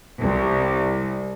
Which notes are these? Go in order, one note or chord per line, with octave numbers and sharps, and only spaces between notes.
C2